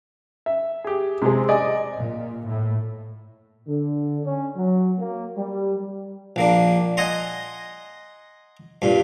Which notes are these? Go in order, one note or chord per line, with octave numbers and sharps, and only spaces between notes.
E5
G4 G#4
C3 G#3 C4 G#4
D5 D#5 G#5
A#2
A2
D3
C#4
F#3
A#3
G3
A#1 A#3 D4
D#5 F#5 G#5 A#5 C6
G2 A#2